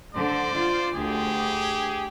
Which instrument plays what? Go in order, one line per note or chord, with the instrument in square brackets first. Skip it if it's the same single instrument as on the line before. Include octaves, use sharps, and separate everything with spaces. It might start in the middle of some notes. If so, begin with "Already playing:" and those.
[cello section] D3 [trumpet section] C5 D5
[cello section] F4
[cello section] D2 [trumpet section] G4 G#4